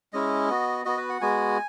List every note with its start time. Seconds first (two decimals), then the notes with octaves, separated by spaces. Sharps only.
0.13 G#3 C#4 E4 D#5
0.49 B3 F#4
0.85 B3 F#4 D#5
0.97 B4
1.09 F#5
1.21 G#3 B3 F#4 G#5